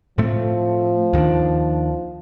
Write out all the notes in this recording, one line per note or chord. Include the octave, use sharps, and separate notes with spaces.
A2 F3 A3 C4
D#2 D#3 G3 D4